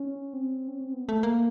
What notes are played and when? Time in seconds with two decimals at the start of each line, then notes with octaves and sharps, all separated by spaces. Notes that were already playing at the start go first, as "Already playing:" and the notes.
Already playing: C#4
0.33 C4
0.68 C#4
0.80 C4
0.94 B3
1.09 A3
1.23 A#3